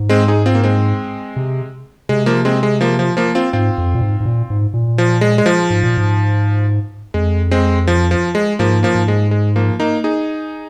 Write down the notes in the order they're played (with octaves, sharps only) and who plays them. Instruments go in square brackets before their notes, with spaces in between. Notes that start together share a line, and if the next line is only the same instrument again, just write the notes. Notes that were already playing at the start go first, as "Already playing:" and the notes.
Already playing: [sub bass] G#2
[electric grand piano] G#3 C4
D#4 G#4
C4 F4
A#3
G#3 C4
[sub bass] C3
[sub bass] C3 [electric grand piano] G#3
[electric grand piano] F3 A#3
G#3 C4
G#3
F3 A#3
F3
F3 A#3
C4 F4
[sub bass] G#2 [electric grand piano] C4 F4
[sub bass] F2
A#2
G#2
G#2
A#2
G#2
A#2
[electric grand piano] F3
G#3
G#3
F3
[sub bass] G#2
A#2
G#2
[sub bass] F2 [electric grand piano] G#3
[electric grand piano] G#3 C4
F3
F3
G#3
[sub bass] G#2 [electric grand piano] F3 A#3
[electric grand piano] F3 A#3
[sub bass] G#2
[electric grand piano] G#3
G#3
F3 A#3
A#3 D#4
D#4 G#4